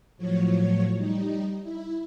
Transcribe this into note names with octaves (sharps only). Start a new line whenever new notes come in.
A2 F3 F#3 C#5
G3 D#4
E4